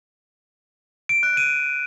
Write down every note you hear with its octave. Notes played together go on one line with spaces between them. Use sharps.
D7
F#6
D#7